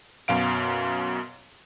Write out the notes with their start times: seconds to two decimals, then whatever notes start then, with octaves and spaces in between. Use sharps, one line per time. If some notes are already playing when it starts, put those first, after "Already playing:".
0.28 F#2 B2 F5 D7